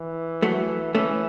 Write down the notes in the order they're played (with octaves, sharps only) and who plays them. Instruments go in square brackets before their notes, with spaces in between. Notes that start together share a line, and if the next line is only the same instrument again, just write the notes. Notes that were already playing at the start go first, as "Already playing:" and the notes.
Already playing: [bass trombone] E3
[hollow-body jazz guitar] F#3 A3
[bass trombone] E3 [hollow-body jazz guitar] A3 C#4